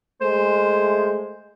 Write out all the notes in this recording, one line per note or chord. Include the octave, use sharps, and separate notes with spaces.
G#3 A3 C5